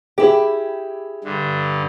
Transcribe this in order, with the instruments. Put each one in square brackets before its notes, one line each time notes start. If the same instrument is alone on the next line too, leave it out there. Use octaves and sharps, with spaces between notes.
[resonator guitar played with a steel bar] E4 G4 [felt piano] G#4
[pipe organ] G2 D3